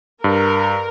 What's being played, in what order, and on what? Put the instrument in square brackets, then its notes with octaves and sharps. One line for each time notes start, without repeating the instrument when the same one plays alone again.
[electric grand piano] G2 [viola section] A#4